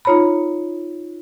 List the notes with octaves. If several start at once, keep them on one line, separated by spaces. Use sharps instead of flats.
D#4 F4 C#5 A#5 B5